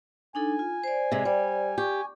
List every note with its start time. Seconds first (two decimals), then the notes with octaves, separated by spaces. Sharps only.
0.35 D4 D#4 A4 G#5
0.59 F4
0.84 C5 D5
1.12 C3 G#3
1.25 G3
1.78 G4 C#6